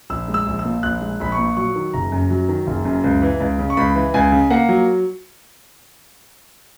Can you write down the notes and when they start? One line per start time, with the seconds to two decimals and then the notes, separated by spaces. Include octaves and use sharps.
0.10 A#1 E6
0.28 G#3
0.34 E6
0.47 A#1
0.59 E6
0.65 A#2
0.83 A#1 F#6
1.01 G#3
1.20 A#1 B5
1.32 C#6
1.38 A#2
1.57 F#3 C#6
1.75 D#3
1.94 F#1 A#5
2.12 F#2
2.30 F#3
2.49 D#3
2.67 F#1
2.85 F#2
3.04 C#2
3.22 E3
3.40 C#2
3.59 C#3
3.70 C#6
3.77 C#2 B5
3.95 E3
4.14 C#2 G#5
4.32 C#3
4.50 A#3 F#5
4.69 F#3